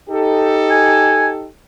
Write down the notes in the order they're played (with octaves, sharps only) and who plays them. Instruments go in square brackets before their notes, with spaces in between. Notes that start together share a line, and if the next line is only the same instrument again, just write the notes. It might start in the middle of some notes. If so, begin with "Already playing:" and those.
[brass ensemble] D#4 G4 A4
[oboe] G#5